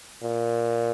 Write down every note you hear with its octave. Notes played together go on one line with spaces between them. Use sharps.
A#2